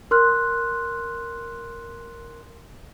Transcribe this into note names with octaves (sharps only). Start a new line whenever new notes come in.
A#4 C6 F6 F#6